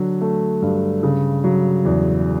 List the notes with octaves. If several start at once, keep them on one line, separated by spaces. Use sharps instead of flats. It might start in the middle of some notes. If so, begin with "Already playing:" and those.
Already playing: D3 F#3
A3
G2
C#3
F#3
E2